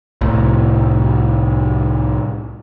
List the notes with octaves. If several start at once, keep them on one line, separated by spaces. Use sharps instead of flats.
C2 A2